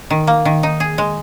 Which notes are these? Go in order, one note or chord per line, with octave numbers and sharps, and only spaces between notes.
D#3
A#3
D#3
D#4
G#4
G#3